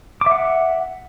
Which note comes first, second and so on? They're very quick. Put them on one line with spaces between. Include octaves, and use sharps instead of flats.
D6 E5 F#5